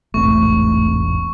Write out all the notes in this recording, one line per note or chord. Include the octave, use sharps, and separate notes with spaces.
E1 A1 G#2 A3 C4 C#6